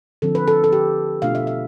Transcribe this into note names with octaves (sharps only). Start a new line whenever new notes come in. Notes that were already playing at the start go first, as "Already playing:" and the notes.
D3 F3 C4 A4
B4
A4
A4
G4
B2 A3 D4 F4 F5
E5
E5